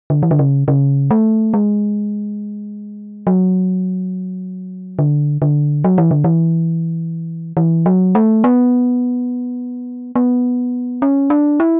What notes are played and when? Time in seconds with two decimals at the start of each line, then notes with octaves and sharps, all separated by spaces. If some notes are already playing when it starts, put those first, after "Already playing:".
0.10 D3
0.23 E3
0.31 D3
0.39 C#3
0.68 C#3
1.11 A3
1.54 G#3
3.27 F#3
4.99 D3
5.42 D3
5.84 F#3
5.98 E3
6.11 D3
6.24 E3
7.57 E3
7.86 F#3
8.15 A3
8.44 B3
10.16 B3
11.02 C#4
11.30 D4
11.60 E4